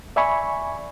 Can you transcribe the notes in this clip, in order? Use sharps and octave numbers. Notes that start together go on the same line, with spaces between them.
D5 E5 G#5 B5 C#6